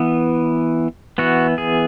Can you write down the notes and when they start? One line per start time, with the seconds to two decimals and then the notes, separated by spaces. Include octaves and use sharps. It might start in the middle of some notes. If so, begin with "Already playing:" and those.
Already playing: E3 B3
1.18 E3 B3 F#4
1.58 G#4